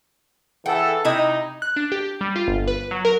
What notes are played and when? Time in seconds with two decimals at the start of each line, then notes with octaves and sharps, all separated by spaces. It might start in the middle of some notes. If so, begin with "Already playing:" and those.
0.66 E3 G#4 A4 F#5 G5
1.05 C3 D#4 E4 D#5
1.62 F#6
1.76 D4
1.92 G4
2.21 G3
2.36 F4
2.48 G1
2.68 B4
2.91 F#3
3.05 A#4